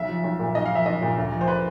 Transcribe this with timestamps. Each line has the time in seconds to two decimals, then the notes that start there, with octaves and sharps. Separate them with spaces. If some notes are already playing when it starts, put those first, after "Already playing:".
Already playing: B1 E5
0.08 F3
0.24 B1
0.39 A#2
0.55 B1 D#5
0.65 F5
0.71 F3 E5
0.86 B1 D#5
1.01 A#2
1.17 D2
1.32 F3
1.41 C5
1.48 B4